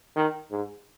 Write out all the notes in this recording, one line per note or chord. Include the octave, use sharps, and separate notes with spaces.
D#3
G#2